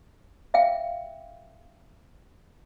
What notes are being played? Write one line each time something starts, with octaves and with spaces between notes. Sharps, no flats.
E5 F5 G5